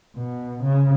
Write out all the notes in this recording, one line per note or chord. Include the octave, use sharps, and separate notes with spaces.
B2
C#3